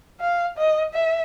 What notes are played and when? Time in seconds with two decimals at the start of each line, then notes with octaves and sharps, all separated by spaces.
0.20 F5
0.57 D#5
0.93 E5